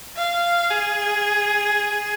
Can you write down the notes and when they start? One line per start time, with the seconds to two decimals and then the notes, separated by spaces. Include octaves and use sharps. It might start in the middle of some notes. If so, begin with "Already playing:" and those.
0.17 F5
0.71 G#4